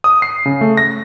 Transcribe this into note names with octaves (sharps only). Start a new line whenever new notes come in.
D#6
C7
C#3
A3
A#6